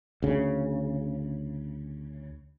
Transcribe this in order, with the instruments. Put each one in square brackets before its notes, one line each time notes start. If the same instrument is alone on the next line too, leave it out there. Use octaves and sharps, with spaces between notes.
[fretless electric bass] D2 C#3